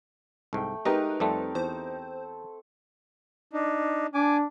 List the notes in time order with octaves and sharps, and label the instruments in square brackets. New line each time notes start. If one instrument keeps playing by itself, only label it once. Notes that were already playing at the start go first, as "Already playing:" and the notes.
[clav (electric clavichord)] C2 G#2 [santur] A3 G5
[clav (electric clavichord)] G#3 D#5 [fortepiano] D#4 G4 A#4 [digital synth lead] B4
[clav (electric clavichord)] F2 G3 A3 [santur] C4 A4 A5
[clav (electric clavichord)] E2 [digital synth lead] C5
[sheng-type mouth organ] D4 D#4
[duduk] D4 [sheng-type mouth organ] G#5 D6